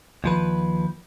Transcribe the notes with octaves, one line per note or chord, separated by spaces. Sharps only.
D#2 F3 B4